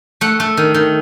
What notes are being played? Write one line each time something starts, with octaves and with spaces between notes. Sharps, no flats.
A3 F#5
A3
D#3
D#3